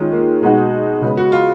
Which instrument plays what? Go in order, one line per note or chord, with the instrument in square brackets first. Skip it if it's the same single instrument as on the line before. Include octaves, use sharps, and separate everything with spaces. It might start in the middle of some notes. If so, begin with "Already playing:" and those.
Already playing: [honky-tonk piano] D#3 G#3 C#4 F4
[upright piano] A#3
[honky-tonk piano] B2 G#3 B3 D#4 F#4
C#3 G#3 B3
[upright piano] F#4
F4